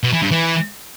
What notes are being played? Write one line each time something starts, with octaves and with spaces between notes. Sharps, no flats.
B2
E3
G2
E3